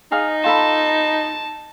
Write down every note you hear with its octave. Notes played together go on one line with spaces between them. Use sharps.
D#4 G#4 F5 D#6
F4 A4 A5 B5